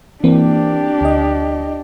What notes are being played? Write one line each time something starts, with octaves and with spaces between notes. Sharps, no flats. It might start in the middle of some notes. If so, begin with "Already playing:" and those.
E3 A#3 C4 D4 G4
D2 D#5